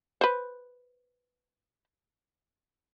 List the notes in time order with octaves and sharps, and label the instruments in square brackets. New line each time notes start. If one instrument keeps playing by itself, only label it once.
[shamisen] B4 C5